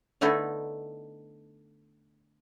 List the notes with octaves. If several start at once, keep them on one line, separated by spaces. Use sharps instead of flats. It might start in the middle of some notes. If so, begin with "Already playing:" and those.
D3 A3 B3 D#4 E4 A4